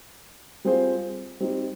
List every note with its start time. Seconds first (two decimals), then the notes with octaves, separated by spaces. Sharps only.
0.65 G3 C4 F4 G#4 C5
1.40 G3 C4 D#4 G4